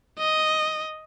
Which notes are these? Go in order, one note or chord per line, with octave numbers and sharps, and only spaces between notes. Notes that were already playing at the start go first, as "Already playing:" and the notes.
D#5